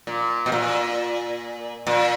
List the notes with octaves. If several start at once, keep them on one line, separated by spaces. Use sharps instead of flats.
A#2
B2
A#2
A#2